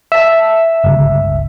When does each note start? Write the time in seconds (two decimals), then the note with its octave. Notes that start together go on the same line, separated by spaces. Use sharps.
0.12 E5 A5 E6
0.84 G1 C#2